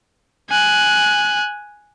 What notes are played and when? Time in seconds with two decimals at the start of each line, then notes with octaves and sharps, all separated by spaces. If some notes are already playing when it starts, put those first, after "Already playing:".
0.49 G#5 F#6